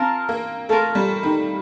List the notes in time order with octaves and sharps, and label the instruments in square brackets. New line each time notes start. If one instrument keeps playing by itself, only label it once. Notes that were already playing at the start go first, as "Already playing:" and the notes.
Already playing: [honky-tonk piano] C4 [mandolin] F4 A#4 F5 A5
[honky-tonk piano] A#3
[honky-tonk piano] A3 [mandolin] F4 A#4 F5 A5
[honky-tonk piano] G3
D#3